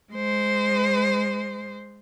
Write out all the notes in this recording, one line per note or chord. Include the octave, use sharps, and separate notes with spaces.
G#3 C5